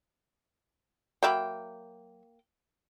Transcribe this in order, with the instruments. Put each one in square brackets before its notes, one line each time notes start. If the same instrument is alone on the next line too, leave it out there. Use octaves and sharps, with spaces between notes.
[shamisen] F#3 E5 B5 [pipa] A#3 G5